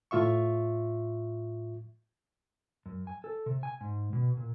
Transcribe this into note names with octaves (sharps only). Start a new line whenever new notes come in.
A2 F4 E5 C#6
F#2
G#5
A4
C3
G#5
G#2
B2
A#2